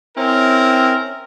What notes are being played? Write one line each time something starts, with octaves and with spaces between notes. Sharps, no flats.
C4 C#4 E4 A#4